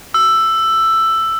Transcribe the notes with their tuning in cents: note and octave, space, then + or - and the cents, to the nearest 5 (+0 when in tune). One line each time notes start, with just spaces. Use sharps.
E6 +10